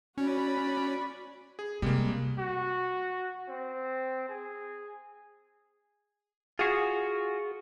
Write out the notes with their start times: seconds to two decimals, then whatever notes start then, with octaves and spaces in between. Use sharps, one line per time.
0.18 C#4 F#4 D5 B5
1.59 G#4
1.82 C3 G3 G#3 A#3
2.39 F#4
3.49 C4
4.29 G#4
6.59 F4 F#4 G#4